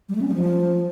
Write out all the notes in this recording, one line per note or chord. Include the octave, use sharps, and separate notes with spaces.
G3
A3
C#4
G3
F3